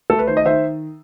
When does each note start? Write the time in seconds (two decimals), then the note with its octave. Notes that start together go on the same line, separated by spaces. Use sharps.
0.10 A3 A4
0.19 B4
0.27 D#3 C5
0.37 D#5
0.45 D#3 C5 E5